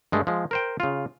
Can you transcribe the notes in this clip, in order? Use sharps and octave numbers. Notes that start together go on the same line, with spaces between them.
G2 G#3 A3
F3 G#3
A#4 C5 G5
C#3 F4